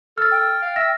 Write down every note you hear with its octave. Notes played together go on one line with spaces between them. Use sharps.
A4 F6 A6
G5
F5
E5 A#6